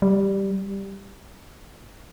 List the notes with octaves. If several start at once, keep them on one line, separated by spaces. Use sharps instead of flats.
G3